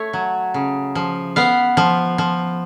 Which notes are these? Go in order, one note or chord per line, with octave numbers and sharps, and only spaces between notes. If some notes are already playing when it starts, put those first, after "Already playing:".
Already playing: A3 C#5
F#3
C#3
F3
B3 F5
F3
F3